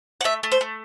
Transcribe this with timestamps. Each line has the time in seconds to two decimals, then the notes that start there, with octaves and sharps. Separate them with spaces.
0.21 F#5
0.24 A3 E5
0.43 A3
0.52 C5
0.61 A3